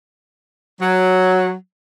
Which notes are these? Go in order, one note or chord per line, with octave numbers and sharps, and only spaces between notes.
F#3